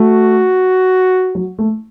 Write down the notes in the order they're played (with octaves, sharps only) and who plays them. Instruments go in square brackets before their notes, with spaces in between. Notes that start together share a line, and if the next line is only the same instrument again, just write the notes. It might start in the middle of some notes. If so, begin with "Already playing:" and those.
Already playing: [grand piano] A3 [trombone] F#4
[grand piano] F#3
A3